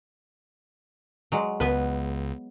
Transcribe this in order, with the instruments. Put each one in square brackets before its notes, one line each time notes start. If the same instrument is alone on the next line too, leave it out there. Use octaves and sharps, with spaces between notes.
[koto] F#3 G#3
[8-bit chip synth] C#2 [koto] B3 B4